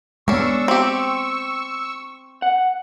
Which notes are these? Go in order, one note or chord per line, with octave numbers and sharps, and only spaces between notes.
G#3 B3 C#4 D4 C#6 E6
C4 G4
F#5